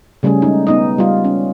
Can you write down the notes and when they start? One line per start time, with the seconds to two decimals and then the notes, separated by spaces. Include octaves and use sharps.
0.23 C#3 G3 A3 C#4 G#4
0.42 G#3 D#4
0.67 B3 D#4 D#5
0.98 G3 F4
1.24 C#4